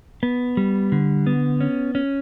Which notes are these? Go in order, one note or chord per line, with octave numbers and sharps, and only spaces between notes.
B3
G3
D3
B3
C#4
C#4